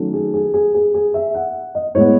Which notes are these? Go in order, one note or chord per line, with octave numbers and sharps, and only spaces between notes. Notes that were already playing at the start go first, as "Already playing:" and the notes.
Already playing: D#3 F#3 A3 C#4
G#4
G#4
G#4
G#4
G#4
E5
F#5
D#5
A2 G#3 B3 C#5